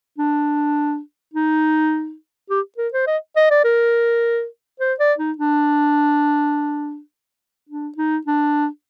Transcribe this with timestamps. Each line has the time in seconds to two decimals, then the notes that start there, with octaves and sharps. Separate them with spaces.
0.18 D4
1.34 D#4
2.50 G4
2.78 A#4
2.93 C5
3.07 D#5
3.36 D#5
3.50 D5
3.64 A#4
4.80 C5
4.99 D5
5.18 D#4
5.38 D4
7.69 D4
7.97 D#4
8.26 D4